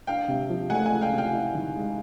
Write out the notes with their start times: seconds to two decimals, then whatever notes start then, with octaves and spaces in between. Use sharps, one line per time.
0.07 D4 F5 G5
0.28 C3
0.49 F3
0.70 A3 F#5 G#5
0.86 F#5 G#5
0.91 C#2
1.01 F5 G5
1.13 C3
1.18 F5 G5
1.33 E4
1.54 D#3
1.75 G#3